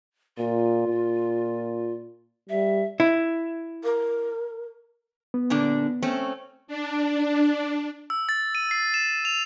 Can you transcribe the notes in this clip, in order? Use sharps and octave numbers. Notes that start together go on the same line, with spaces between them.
A#2 F4
A#2
G3 E5
E4
A#4
B3
A#2 D3 D4
A3 C4 C#4
D4
E6
A6
D#7
C7
E7
F7